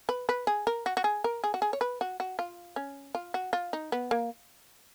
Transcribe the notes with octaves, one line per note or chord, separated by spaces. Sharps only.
B4
B4
G#4
A#4
F#4
F#4
G#4
A#4
G#4
F#4
G#4
C#5
B4
F#4
F#4
F4
C#4
F4
F#4
F4
D#4
B3
A#3